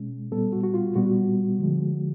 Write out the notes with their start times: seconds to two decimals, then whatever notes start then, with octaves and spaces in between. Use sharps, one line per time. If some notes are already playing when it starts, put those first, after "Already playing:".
Already playing: B2 G#3 C#4
0.32 A#2 G3 B3 A4
0.53 F#4
0.63 F#4
0.74 F4
0.95 A#2 G3 B3 F#4
1.59 D3 F3 G#3